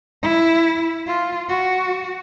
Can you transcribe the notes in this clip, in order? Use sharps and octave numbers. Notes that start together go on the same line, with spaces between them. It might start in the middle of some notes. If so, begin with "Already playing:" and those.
E4
F4
F#4